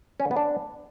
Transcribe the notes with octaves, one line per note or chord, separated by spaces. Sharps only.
C#4
D3
B3
D4